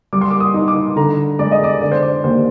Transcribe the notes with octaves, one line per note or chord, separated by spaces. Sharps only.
G3 D6
C6
D6
D#6
D#4
D6
D3 A#5
G#3 D5
D#5
D5
D3 D5
C5
D5
D#2 C5